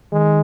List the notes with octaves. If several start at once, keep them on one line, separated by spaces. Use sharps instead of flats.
D#3 G#3